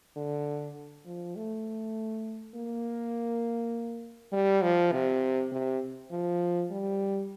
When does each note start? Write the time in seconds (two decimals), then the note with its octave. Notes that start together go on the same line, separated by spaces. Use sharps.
0.16 D3
1.06 F3
1.36 A3
2.55 A#3
4.32 G3
4.62 F3
4.92 C3
5.52 C3
6.11 F3
6.71 G3